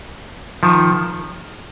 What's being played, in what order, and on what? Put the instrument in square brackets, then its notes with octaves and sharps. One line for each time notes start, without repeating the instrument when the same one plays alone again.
[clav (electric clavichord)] D#3 F3